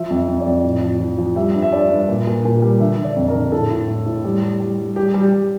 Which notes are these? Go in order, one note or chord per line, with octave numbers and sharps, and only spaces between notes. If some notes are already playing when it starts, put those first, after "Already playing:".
Already playing: F3 E5
F2
E5
F2
D5
F2
A2
F3
F3
F3
G3 E5
G2
E5
G2 D5
G2
A#2
A#2
A#2
G3
D3 E5
D3
D5
F2
A#4
D3
A2 A4
A2
A2
A2
G3
G3
G3
G3
G3 G4
G3
G4
G3